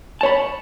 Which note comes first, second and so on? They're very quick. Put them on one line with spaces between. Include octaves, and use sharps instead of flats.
A5 C#5 B5